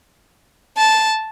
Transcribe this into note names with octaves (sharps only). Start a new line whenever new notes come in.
A5